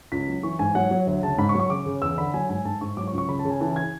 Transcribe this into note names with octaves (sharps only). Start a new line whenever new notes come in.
C#2 B6
F#3
E3 C#6
G#2 G#5
F#3 F#5
F#3
D2
C#3 A5
G#2 B5
C#6
F#3
C#6
C#3 D6
C#3
E2 E6
D3 B5
F#3 G#5
G#2 G#5
G#2 A5
G#2 C#6
F#3 D6
C#6
C#2
C#6
C#3 B5
A5
C#3
G#5
E3 A5
G#6